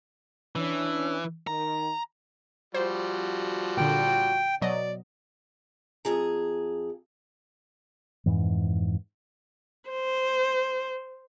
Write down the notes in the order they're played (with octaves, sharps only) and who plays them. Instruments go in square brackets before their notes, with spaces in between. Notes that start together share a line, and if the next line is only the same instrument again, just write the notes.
[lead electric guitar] E3 [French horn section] C#4 D4
[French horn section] D#3 [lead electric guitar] A#5
[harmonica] F3 G3 F#4 [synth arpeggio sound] C5
[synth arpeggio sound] A#2 D3 [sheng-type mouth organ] G5
[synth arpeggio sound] B2 F#3 D#5 [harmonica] D5
[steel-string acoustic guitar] F2 G#4 A#5
[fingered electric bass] F2 G#2 E3
[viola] C5